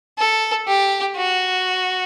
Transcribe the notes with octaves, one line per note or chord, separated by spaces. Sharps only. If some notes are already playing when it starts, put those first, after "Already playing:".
A4
G4
F#4